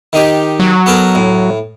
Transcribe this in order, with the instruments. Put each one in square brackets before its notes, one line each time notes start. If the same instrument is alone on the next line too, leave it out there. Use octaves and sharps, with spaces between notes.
[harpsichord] D#3 D#4 G4
[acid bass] F#3
[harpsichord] B3 A4 A#4
A2